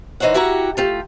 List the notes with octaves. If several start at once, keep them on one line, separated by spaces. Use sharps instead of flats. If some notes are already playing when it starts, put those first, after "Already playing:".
E3 D#4 C5 C#5 F#5
E4 F#4 G4 F#5 A#5
A3 F4 G4